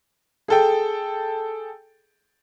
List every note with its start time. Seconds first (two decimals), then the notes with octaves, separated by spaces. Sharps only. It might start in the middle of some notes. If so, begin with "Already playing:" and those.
0.48 G#4 A4 G5